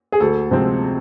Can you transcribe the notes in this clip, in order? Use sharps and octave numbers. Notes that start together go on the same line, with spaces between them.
G#4
D2 A4
C3 F3 G#3 C4